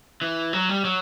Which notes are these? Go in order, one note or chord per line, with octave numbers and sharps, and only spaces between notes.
E3
F#3
G3
F#3